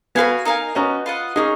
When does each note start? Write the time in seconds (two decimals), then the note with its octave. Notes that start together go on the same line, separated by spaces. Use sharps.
0.15 B3 F#4 B4 F5 G#5
0.45 D#4 A#4 F5 G#5
0.75 B3 C#4 D#4 F#4
1.06 F4 B4 D#5 F#5
1.36 A#3 C#4 D#4 G#4